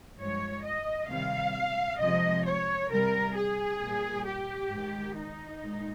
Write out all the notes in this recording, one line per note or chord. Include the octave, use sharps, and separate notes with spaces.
G2 F3 G#3 C#5
D#5
C3 D#3 G3 F5
C3 F3 G#3 D#5
C#5
C3 G3 A#4
G#4
A#2 G3
G4
G#2 D#3 G#3
D#4
A#2 G#3